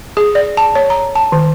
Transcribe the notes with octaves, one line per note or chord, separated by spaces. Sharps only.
G#4
D5
A5
C#5
A#5
A5
D#3